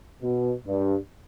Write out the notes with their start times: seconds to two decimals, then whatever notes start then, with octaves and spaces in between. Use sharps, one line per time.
0.22 B2
0.66 G2